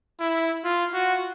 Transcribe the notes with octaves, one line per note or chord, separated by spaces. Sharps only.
E4
F4
F#4